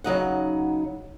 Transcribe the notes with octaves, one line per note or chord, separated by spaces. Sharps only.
C#3 F#3 D#4 F#5